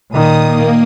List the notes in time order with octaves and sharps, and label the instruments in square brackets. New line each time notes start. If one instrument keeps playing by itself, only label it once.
[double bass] A#2 D#3 [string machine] D#6
[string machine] A#3